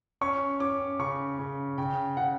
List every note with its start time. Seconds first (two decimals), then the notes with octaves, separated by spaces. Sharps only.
0.21 C#4 C#6
0.60 C#4 D6
0.99 C#3 C#6
1.39 C#3
1.78 C#3 G5
2.17 C#3 F#5